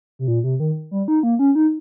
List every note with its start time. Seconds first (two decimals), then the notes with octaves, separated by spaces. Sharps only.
0.19 C3
0.28 A#2
0.44 C3
0.60 D#3
0.91 G3
1.08 D#4
1.23 A#3
1.39 C#4
1.55 D#4